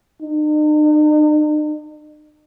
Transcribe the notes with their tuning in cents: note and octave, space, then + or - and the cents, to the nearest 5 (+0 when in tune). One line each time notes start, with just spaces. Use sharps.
D#4 -45